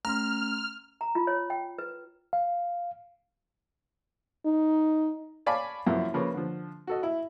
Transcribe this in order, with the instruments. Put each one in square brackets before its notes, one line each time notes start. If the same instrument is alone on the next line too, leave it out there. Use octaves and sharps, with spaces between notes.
[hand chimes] A3 C#4 C6 [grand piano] A#5 [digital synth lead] F6
[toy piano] A#5
F4
C#5
G5
B4
[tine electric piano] F5
[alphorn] D#4
[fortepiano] C#5 D5 F5 G#5 A5 B5
F#2 F3 A#3 E4 F4
C#3 F3 A#3 F4 B4
D3 F3
F#4 A4 D#5
E4